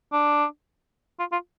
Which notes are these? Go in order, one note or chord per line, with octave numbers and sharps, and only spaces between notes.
D4
F4
F4